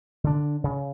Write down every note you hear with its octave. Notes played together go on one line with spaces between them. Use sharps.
D3 D4
C#3